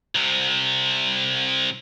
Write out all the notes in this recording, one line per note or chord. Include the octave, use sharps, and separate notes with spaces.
C2 C3